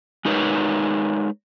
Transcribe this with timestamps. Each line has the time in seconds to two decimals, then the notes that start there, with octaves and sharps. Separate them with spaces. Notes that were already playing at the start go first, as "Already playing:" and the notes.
0.25 G#3 D#4 A#4 B4 C#5